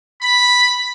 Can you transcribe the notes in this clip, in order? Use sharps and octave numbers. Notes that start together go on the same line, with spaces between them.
B5